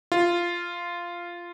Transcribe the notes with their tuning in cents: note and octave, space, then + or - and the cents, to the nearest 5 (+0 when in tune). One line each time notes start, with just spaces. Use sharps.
F4 -10